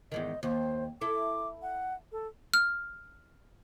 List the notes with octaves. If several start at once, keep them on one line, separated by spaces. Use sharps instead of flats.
E2 G#2 D#3 D#5
D#2 C5
E4 A4 D6
F#5
A4
F6